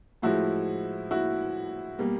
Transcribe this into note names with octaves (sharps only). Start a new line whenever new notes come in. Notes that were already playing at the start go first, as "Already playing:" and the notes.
A2 F3 G#3 E4 F#4
E4 F#4
B2 G3 A#3